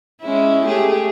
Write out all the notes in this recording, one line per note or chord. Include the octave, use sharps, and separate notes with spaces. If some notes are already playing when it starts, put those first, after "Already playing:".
G#3 C#4 E4
A3 G4 G#4